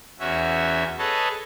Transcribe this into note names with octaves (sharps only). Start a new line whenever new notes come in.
E2 C#4 F#4 E5
G#4 A4 B4 C#5 D#5 A5